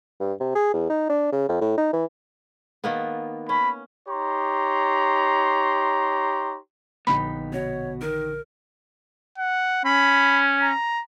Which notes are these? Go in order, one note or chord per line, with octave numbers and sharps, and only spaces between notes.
G2
C3
G#4
E2
D#4
D4
C#3
F2
A2
D#4
E3
D#3 A#3 B3
C#4 B5
D#4 G4 C#5 A#5 C6
A#1 D3 B3 D#4 G4 B5 B6
B2 F#4 C#5
D#3 A#4
F#5
C#4 B5
A#5